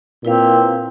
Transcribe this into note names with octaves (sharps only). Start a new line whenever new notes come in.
A#2 C4 E4 B4 F5